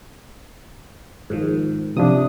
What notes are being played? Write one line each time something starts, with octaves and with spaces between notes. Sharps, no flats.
G#2 D#3 F3
C3 F3 D4 D#6